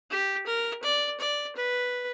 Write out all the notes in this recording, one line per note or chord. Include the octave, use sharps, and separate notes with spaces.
G4
A#4
D5
D5
B4